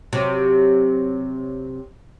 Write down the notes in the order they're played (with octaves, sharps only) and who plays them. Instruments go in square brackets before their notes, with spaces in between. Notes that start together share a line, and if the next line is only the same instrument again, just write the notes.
[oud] C3 F#3